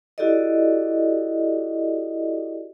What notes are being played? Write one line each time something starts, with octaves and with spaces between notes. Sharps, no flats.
E4 F#4 G4 A4 D5 D#5